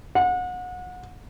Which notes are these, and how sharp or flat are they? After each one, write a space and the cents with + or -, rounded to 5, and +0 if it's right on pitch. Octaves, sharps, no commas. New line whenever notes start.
F#5 -30